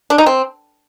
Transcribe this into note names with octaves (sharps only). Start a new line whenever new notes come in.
D4
D#4
C4